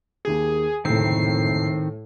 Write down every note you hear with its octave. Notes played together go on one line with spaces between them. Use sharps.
D#2 D#3 G4 G#4
F#1 D2 A2 C3 D#3 C4 C7